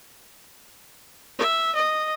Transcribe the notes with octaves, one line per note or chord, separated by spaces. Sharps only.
E5
D#5